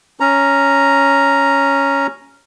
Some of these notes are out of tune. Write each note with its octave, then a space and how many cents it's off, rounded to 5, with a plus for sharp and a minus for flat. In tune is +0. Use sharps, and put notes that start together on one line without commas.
C#4 +0 A#5 +0